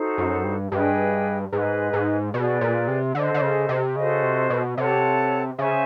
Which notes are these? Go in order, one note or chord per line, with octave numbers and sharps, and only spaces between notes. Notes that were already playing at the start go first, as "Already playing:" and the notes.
Already playing: D#4 F#4 A4 C5
F#2
G2
G2 G#4 B4 D#5 G5
G#2 G#4 B4 D#5
G#2
B2 G#4 B4 D5
A#2
C3
D3 A4 C5 D#5
D3
C#3
C3
C#3 F#4 A4 C5 D#5
C3
B2
C3 A4 C#5 F#5 A5
C#3 C5 E5 G#5 C#6